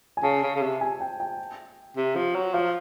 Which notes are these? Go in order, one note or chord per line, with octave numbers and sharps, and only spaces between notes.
G#5
C#3 A5
C#3
C#3
C3
G#5
G5
G5
C3
F3
F#3
F3 F5